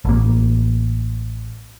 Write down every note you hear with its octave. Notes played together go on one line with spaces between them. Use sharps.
A1 A#3